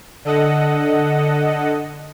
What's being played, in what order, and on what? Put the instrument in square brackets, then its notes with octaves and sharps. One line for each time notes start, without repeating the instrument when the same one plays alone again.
[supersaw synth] D3 A4 D#5 F#5